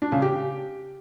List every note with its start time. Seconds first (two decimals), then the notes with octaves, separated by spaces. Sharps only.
0.02 D4
0.12 C#3
0.22 G4